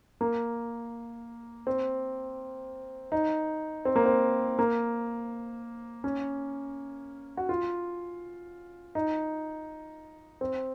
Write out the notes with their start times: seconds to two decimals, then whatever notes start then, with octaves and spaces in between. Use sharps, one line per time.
0.21 A#3
1.67 C4
3.12 D#4
3.85 C4
3.96 A#3
4.06 C4
4.59 A#3
6.04 C#4
7.37 F#4
7.49 F4
8.95 D#4
10.41 C4